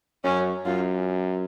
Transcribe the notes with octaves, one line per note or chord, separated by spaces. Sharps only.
F#2 C#4
F#2 F4